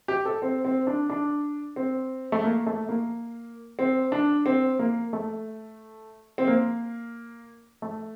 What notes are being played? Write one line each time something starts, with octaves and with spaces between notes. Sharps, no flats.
G4
A4
C4
C4
D4
D4
C4
A3
A#3
A3
A#3
C4
D4
C4
A#3
A3
C4
A#3
A3